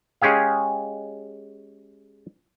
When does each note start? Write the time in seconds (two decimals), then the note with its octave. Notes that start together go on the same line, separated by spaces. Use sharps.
0.22 G#3 C#4 G4 G#4 F5